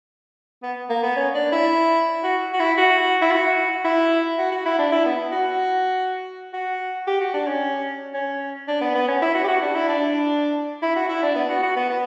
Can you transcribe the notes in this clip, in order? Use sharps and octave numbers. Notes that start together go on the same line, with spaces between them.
B3
A#3
B3
C#4
D4
E4
F#4
F#4
E4
F#4
E4
F#4
E4
F#4
F#4
E4
D4
E4
B3
F#4
F#4
G4
F#4
D4
C#4
C#4
D4
B3
B3
C#4
E4
F#4
G4
F#4
D4
E4
D4
E4
F#4
E4
D4
B3
F#4
F#4
B3
B3